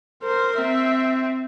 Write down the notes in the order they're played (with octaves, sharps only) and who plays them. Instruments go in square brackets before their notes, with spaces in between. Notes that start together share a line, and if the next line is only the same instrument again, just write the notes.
[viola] A#4 [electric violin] C5
[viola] C4 [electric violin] E5